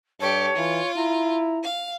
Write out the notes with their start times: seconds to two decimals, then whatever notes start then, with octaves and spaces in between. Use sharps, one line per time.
0.20 G2 G4 A4 C#5
0.57 E3 F4
0.96 E4 A#5
1.64 F5